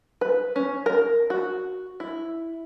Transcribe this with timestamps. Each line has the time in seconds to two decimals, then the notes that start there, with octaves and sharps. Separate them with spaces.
0.21 B4
0.56 C#4
0.86 A#4
1.30 F#4
2.00 E4